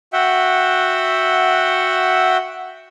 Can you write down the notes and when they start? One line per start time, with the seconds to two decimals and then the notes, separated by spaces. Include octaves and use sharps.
0.13 F#4 E5 F#5 G5